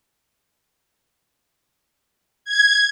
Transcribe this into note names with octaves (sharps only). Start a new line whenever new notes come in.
G#6